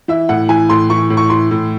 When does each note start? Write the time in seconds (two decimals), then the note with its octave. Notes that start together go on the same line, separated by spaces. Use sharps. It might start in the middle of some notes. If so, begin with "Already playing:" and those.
0.08 E3 E5
0.29 A2 F#5
0.49 E3 G#5
0.69 A2 C6
0.90 E3 C#6
1.10 A2
1.17 C#6
1.30 E3 C6
1.51 A2